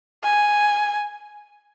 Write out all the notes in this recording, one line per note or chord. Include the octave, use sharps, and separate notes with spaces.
G#5